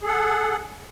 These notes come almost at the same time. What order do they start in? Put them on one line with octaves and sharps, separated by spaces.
G#4 A4 F#5